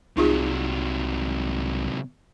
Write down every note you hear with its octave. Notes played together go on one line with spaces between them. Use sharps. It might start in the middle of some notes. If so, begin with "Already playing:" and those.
C2 C3 F#3 D#4 F4 G#4